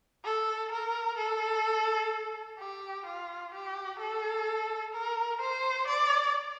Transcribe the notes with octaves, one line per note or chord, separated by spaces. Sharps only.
A4
A#4
A4
G4
F4
G4
A4
A#4
C5
D5